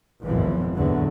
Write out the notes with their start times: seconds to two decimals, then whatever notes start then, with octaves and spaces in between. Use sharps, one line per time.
0.25 G#1 C#2 F#2 B2 E3 F3
0.76 E2 A2 D3 F#3